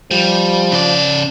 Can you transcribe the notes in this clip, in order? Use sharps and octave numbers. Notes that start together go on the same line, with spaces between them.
F3 G3
C#3 D5